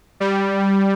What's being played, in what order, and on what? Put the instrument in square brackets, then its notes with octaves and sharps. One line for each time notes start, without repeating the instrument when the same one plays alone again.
[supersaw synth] G3